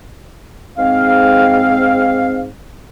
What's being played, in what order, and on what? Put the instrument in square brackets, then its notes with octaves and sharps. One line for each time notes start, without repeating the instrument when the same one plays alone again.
[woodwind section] G#2 C4 F5